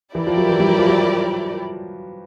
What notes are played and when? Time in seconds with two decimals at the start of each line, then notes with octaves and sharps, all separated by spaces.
0.15 E3 E4 G4 A#4 D5
0.27 F3
0.37 F#3
0.49 E3
0.60 G3
0.70 F#3
0.78 F3
0.88 F#3